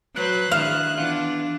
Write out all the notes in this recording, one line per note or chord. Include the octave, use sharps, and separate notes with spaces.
F#3 B4 C5 F#6
D#3 D4 E4 G#4 F5
E3 B3 D4 F4